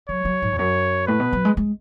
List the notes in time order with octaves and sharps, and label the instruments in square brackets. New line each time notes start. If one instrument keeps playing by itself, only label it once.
[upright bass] F#3 [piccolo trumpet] C#5
[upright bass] F#3
G#2
E2
[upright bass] F#2 [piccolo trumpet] C#5
[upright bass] A2 [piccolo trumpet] B4
[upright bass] B2
F#3
G#3
G#3